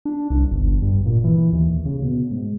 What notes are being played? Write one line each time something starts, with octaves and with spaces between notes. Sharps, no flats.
D4
C2
G1
G2
A#2
E3
D#2
C#3
B2
G#2